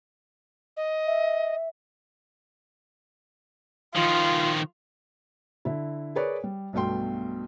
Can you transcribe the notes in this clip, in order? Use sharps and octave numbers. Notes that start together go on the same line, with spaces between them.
D#5
E5
D#3 F3 F4
D3 E4
G#4 A#4 B4 C#5 D5
G3
B1 G2 B2 A3 G5 C6